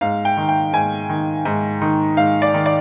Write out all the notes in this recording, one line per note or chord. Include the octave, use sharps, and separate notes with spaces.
G#2 F5
G5
D#3
G5
G#2 G#5
D#3
G#2
D#3
G#2 F5
D5
D#3
D5